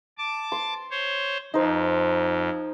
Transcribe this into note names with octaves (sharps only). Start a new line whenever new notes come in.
A5 D6
C6
C5 C#5
F2 D#4 C5